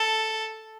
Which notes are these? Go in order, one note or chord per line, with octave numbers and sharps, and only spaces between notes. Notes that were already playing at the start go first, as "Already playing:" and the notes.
Already playing: A4